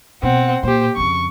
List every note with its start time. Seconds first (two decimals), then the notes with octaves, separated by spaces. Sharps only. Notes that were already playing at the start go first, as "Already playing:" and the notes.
0.23 B2 C4 F#5
0.63 A#2 G4 C5
0.96 F2 C#3 C#6